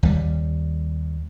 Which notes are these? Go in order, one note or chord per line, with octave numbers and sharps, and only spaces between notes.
D#2 G3